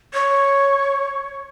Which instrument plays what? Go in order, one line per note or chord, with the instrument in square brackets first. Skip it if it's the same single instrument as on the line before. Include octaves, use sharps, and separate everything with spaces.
[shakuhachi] C#5